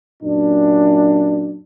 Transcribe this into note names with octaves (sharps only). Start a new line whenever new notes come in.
F#2 A#2 D4